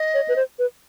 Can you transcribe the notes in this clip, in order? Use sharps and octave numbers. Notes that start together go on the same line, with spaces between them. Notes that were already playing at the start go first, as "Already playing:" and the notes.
Already playing: D#5
C#5
B4
C5
B4